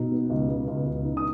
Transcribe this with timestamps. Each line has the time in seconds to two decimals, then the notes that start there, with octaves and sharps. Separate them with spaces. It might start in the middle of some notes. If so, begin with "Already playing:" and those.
Already playing: B2 D#4
0.12 B3
0.30 C#2
0.48 B3
0.67 C#2
0.85 C#2
1.04 D#4
1.17 D#6